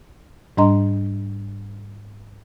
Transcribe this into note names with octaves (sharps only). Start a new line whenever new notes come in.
G#2 G3 D4 D#5 A#5 C6